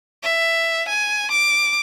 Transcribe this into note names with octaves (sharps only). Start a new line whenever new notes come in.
E5
G#5
D6